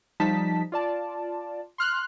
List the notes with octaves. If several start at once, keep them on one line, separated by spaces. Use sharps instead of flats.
F3 G3 D#4 A5 B6
F4 D5 A5
C6 F6 F#6